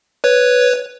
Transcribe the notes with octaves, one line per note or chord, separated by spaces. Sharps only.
B4 C#5